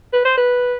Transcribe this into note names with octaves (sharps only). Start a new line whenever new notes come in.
B4
C5
B4